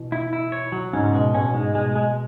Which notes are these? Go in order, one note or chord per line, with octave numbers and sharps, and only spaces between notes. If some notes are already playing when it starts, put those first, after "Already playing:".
Already playing: B2 E3
E4
E4
C#5
F#3
G#2 C#3 C#4
B2 G#3
B2 C#4
B2
G#2 G#3
B2 G#3
G#3